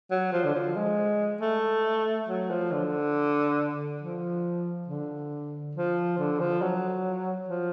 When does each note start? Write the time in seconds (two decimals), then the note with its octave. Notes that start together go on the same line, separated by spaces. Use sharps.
0.11 F#3
0.33 F3
0.44 D3
0.54 F3
0.76 G#3
1.41 A3
2.28 F#3
2.50 F3
2.72 D3
4.02 F3
4.88 D3
5.75 F3
6.18 D3
6.40 F3
6.62 F#3
7.49 F3